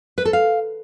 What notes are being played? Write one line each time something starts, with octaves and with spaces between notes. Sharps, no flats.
B4
A4
F5